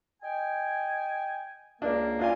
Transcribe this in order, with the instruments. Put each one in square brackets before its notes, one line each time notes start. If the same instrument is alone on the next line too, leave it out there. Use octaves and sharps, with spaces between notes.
[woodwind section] D#5 G5 G#5
[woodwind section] C#2 A#3 [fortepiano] D4
[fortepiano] D4 F4 G#5